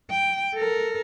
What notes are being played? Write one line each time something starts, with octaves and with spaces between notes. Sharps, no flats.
G5
A4 A#4